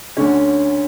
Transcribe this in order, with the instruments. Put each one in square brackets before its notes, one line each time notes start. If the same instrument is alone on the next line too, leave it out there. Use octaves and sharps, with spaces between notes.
[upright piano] D2 D3 C#4